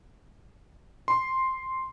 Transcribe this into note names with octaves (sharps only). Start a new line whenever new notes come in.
C6